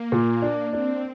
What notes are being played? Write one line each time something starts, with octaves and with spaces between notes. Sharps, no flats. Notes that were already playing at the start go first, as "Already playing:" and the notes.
Already playing: A#3
A#2
D4
C4 D4